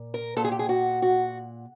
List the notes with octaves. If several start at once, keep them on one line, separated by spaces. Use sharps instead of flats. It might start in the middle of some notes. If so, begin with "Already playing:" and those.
Already playing: A#2
A#4
A#2 A4
G#4
G4
G#4
F#4
F#4